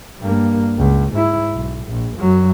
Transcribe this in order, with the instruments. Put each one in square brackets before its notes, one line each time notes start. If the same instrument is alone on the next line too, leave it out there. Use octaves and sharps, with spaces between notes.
[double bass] G2 A#3
C#2
G#2 E4
B1
A#1
F#2 F#3